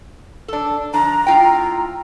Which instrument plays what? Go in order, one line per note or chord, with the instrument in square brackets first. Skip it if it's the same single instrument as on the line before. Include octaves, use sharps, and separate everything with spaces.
[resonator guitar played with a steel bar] D4 A4
[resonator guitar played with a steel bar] D3 F3 D4 [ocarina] A#5
[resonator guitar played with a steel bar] A2 F4 G5